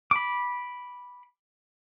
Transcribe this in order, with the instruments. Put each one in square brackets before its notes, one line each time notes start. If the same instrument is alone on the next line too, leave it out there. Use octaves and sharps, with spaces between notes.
[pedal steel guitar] B5 D6